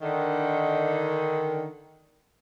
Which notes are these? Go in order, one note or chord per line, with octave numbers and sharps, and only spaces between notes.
D3 D#3